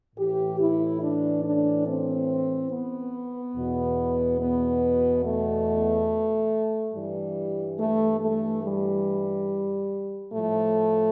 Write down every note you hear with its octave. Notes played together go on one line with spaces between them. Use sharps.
A2 E3 G4
E4
D4
D4
C4
B3
E2 B2
B3
A3
G2 E3 G3
A3
A3
G3
A2 F3 A3